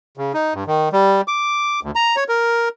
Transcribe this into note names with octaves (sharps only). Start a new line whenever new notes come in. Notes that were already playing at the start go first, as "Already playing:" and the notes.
C#3
D#4
G2
D#3
G3
D6
D2
A#5
C#5
A#4